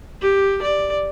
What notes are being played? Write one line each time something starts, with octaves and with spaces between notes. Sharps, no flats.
G4
D5